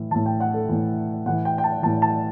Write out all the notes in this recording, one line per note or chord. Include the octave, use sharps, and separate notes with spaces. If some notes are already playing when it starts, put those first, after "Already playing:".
Already playing: A2 E3
A2 E3 A5
G5
F#5
A4
A2 E3
A2 E3 F#5
G5
G5
A5
A2 E3 A5
A5